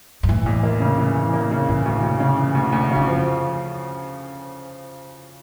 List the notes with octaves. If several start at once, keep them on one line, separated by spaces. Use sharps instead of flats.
G2
A2 E3
E2
A#3
C#3
E3
E2
A#3
C#3
A2 E3
D2
D2
C#3
E3
D2
D2
F2 C#3
F3